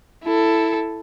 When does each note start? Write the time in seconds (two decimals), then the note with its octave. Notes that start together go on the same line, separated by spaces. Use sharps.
0.23 E4 A4